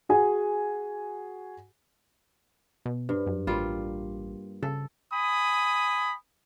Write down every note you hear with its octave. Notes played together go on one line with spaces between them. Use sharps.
F#4 G#4 G#5
B2
G2
F#2
A1 G3 A#3 F4
C#3 A4
G#5 B5 D#6